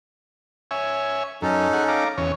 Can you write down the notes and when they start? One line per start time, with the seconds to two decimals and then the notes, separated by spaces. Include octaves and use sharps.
0.71 C#5 E5 G#5
1.42 F#2 C#4 D#4 A4
1.73 G#4 F#5
1.88 F5 A#5 D6
2.18 E2 C#4 C#5